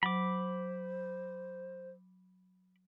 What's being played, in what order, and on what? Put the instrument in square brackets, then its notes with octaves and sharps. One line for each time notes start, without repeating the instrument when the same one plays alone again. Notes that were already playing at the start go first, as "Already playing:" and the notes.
[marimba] F#3 [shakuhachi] C5 [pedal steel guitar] B5 D6